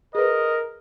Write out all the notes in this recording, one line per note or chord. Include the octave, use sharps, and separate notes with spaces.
G#4 A#4 B4 D#5